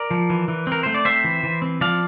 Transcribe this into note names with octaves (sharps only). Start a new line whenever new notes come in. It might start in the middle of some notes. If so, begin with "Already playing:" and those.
Already playing: A#4 D5
F3
E3
E3
C4 A#4
A3 C5
D5
C4 C5 E5
E3
E3
C4
F3 D5 F5